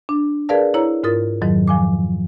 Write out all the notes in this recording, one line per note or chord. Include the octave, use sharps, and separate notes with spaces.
D4
G#4 A#4 B4 D5 F5 A5
E4 C#5 A#5
G#2 F4 A#4 D#6 A6
F2 G#2 D#3 F#3
F3 G#5 D6